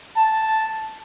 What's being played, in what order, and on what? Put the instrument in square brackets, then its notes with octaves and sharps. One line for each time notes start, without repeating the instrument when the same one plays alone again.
[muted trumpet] A5